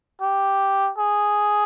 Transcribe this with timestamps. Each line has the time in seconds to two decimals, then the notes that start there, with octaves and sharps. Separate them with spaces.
0.21 G4
0.98 G#4